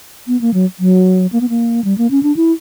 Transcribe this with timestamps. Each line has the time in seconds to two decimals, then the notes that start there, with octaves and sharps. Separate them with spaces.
0.28 B3
0.41 A#3
0.54 F#3
0.80 F#3
1.32 A#3
1.41 B3
1.49 A#3
1.84 G3
1.98 A#3
2.11 C#4
2.23 D4
2.36 E4